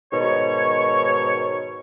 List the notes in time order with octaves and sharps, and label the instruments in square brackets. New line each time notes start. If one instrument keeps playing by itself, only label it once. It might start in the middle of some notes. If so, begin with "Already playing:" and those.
[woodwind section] G#2 B2 D#3 C#5